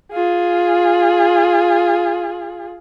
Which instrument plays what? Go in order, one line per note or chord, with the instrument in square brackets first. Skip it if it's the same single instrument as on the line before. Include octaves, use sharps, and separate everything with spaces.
[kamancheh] F4 G#4